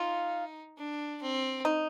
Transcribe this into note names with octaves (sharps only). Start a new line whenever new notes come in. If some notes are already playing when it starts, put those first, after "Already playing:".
Already playing: D#4 F4
D4
C4
D#4